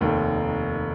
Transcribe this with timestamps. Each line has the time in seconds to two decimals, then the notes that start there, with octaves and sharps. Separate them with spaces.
0.01 F1 D#2 D#3